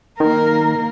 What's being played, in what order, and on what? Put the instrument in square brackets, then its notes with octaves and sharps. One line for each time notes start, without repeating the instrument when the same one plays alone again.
[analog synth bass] D#3 [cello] A#3 A#4